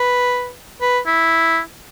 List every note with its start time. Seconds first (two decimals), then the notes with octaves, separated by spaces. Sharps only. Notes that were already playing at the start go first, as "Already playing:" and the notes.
Already playing: B4
0.81 B4
1.06 E4